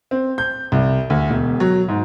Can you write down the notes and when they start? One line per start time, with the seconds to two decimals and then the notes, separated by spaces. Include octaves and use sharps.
0.11 C4
0.38 G6
0.72 C2
1.10 D2
1.30 E1
1.60 F#3
1.88 G#2